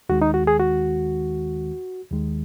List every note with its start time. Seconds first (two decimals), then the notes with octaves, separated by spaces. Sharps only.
0.09 D#2 D#3 G#3 F#4
0.22 D#4
0.34 F#4
0.47 G#4
0.60 F#4
2.11 D#2 D#3 G#3